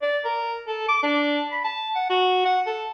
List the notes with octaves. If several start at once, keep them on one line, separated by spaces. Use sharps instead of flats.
D5
A#4
A4
D6
D4
B5
A5
F#5
F#4
F#5
A4